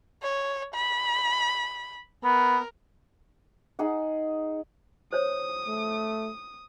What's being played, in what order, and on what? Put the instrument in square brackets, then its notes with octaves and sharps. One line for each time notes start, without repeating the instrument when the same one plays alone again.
[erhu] C#5
B5
[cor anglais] B3 [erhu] A#4
[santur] D#4 G#4 F#5
[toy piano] C5 C#5 [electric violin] D#6
[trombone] A3